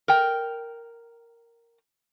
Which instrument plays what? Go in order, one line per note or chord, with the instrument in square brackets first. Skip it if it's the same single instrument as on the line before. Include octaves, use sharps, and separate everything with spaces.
[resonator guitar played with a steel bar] A#4 G5